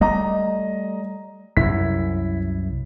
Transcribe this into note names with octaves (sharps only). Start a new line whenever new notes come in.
G3 A3 D#5 A#5
C2 F#2 E4 B6